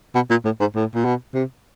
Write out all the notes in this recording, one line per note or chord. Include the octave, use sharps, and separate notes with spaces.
B2
A#2
A2
G#2
A2
A#2
B2
C3